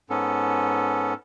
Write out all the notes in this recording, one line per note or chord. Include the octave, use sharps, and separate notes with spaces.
G#2 B3 C#4 A4